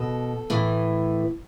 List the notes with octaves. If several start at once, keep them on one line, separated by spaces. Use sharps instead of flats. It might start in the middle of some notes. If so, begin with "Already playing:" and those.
Already playing: B2 A4
A2 E3